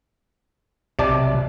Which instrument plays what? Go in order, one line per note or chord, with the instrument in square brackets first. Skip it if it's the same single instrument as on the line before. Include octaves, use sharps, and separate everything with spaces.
[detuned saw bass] B1 [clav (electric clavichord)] C3 D5 A5